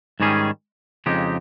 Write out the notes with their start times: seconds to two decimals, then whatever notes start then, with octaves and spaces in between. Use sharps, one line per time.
0.20 G#2 D#3 G3 C#4 G#4
1.06 F2 C#3 G#3 D#4 G4